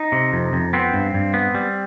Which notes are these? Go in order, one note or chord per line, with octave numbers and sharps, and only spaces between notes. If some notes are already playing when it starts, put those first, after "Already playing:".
Already playing: D#4
C3
F2
F2
B3 C4
G2
G2
B3
G3